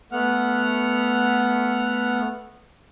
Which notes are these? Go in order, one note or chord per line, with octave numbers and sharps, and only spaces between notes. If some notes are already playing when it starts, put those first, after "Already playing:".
A3 B3 F#5 F6